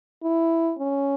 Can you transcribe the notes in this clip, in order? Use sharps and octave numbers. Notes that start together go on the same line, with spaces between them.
E4
C#4